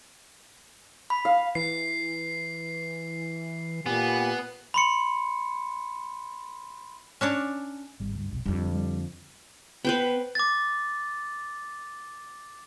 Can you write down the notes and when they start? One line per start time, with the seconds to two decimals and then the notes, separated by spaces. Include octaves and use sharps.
1.10 B5
1.25 F5
1.55 E3 C7
3.86 A#2 B3 G4 G#5
4.74 B5 C6 C#7
7.21 C#4 D4 C#5 D5
8.00 G#1 G3
8.15 D2 G2
8.30 F1 B1
8.46 F2 D3 G3
8.74 G3
9.85 B3 B4 C5 G5
10.35 D6 A6